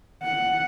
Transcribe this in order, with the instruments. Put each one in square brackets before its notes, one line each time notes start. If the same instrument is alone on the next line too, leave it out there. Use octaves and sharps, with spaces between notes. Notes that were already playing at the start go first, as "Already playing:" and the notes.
[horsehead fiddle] F#5